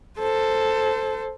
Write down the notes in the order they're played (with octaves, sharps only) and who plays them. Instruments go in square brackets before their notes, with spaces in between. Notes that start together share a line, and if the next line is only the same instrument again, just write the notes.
[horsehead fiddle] A4 C5